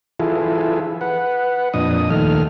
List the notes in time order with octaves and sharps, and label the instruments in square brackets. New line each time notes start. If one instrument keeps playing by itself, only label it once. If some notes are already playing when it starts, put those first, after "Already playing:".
[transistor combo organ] E3 E4 F4 G#4 A4
B4 F#5
F2 A#2 D4 D#5 D#6
D#2 A#2 D#3 A3 A4 F6